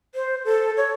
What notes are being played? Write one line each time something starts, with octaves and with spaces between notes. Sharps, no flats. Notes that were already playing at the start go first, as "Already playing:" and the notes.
C5
A4
C#5